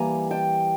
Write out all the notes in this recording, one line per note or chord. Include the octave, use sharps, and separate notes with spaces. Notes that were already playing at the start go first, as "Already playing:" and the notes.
Already playing: E3 G3 A#3 G#5 A#5
G5 A5